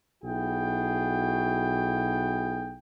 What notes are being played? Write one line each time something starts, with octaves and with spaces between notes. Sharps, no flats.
B1 E4 F#4 G#4 G5